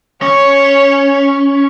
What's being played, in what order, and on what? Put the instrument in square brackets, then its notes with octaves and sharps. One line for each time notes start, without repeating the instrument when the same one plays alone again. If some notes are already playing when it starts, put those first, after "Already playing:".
[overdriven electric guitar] C#4 [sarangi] C#5